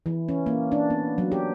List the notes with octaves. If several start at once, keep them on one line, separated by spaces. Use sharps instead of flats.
E3
C#4
A#3
D4
B3
F#3
G4